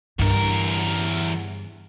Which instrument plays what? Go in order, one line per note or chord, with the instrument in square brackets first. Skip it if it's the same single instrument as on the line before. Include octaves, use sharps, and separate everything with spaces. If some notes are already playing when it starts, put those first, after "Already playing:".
[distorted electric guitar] E2 A#4 [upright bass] G2 D3